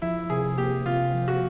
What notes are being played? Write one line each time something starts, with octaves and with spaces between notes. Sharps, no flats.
F3 E4
C3 G#4
A#3 G4
C3 F4
F3
F#4